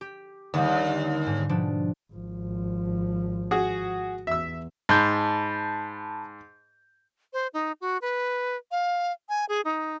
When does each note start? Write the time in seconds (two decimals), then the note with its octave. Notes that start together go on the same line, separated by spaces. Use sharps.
0.01 G4
0.54 D#2 D3 G3
1.26 G#2
1.49 B2 F3 D4
2.13 G#1 F3
3.51 F#4 G#4
4.27 E2 E5 E6
4.89 G#2 A5 B5 G6
7.33 C5
7.54 D#4
7.81 F#4
8.02 B4
8.72 F5
9.29 G#5
9.49 G#4
9.65 D#4